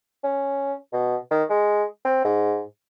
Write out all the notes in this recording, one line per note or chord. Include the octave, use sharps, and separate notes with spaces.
C#4
B2
D#3
G#3
C4
G#2